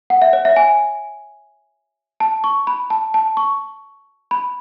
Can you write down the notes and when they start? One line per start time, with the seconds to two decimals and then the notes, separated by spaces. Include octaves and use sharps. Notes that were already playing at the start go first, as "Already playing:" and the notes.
0.10 F#5
0.22 E5
0.33 C#5
0.45 E5
0.56 G#5
2.20 A5
2.44 C#6
2.67 B5
2.90 A5
3.14 A5
3.37 C#6
4.31 B5